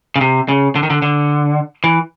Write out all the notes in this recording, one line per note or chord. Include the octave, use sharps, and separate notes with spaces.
C#3
C3
C#3
D3
D#3
D3
D3
E3